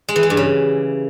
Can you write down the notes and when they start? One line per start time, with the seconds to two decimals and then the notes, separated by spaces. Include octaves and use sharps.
0.09 G#3
0.16 E3
0.23 G#3
0.30 G2
0.37 C#3